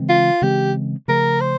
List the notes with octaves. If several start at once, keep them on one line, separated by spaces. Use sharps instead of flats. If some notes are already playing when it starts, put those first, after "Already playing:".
Already playing: C#3 E3 G#3 C4
F4
C#3 E3 G#3 C4 G4
C#3 F3 A3 A#4
C5